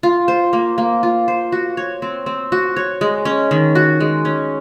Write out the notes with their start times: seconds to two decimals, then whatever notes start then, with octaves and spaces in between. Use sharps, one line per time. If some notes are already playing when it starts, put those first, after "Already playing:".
0.03 F4
0.28 C5
0.53 A#3
0.78 A#3
1.03 F4
1.28 C5
1.52 F#4
1.77 C#5
2.02 C4
2.26 C4
2.52 F#4
2.77 C#5
3.01 G#3
3.25 C#4
3.51 D#3
3.75 F#4
4.00 G#3
4.25 C#4